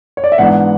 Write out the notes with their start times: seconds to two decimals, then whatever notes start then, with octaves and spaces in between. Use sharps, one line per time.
0.17 C#5
0.24 D5
0.32 E5
0.38 G#2 E3 B3 D4 F#5